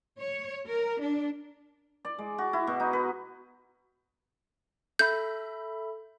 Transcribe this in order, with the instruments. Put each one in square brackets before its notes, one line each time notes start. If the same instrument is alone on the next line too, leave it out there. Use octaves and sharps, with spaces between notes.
[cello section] C#5
A#4
D4
[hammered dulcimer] D5
G#3
F#4
E4
B2
D#4
B4
[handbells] A4 E5 B5 [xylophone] G6